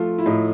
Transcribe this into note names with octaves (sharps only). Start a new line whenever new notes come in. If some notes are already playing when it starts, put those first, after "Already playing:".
Already playing: F3 A3 F4
E4
A2 D#4